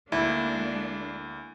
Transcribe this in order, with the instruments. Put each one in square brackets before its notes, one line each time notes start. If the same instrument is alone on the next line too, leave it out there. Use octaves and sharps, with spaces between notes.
[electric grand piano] D2 [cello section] G#3 A#3 D4 [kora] E4